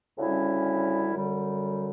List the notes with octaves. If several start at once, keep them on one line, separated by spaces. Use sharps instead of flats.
D2 C#3 G3 C#4 E4
F#2 D3 G3